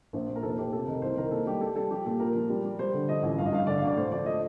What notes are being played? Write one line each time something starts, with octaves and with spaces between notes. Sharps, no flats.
A#1 C5
A#2
A#4
F1 A4
F1 G4
C3 A4
D#3 A#4
C2 C5
D#3 A#4
A#3 A4
G3 G4
G3 A4
G3 A4
F3 G4
A#2 A4
A#3 A#4
F3
G3
G3
G3 C5
D3
F3 D#5
A1
G2 F5
D#5
G2 F5
D3 D5
F5
D2 D5
A2 C5
F3 D5
A3 D#5